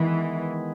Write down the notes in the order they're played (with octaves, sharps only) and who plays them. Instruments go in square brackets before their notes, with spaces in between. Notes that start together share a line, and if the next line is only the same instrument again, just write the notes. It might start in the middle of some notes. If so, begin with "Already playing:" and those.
Already playing: [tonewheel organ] D#3 G#3 B3 [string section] E3